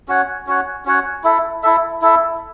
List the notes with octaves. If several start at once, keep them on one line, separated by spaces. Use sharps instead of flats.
C#4 F#4 C#5 F#5
C#4 F#4 C#5 F#5
C#4 F#4 C#5 F#5
E4 A4 E5
E4 A4 E5
E4 A4 E5